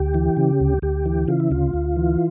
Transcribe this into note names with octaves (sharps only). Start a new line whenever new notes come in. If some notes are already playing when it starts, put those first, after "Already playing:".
Already playing: D2 G4
E3
C#3
D2
D2 G4
E3
C#3 F4
E4
D2 F4
D2
E3